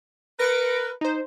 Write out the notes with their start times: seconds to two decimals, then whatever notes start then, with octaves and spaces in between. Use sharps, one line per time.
0.39 A#4 B4 A#6 C#7 D7
1.01 D#4 C5